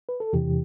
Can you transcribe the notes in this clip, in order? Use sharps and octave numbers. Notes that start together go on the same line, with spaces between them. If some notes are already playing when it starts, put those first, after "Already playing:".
B4
A4
E2 C3 E3 G4